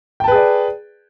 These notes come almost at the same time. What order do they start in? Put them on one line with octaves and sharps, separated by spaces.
G5 A5 B4 G#4 D5